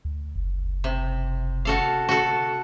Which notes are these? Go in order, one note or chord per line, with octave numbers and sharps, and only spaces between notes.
D2
F#1
C3
F#4 A4 F5
F#4 A4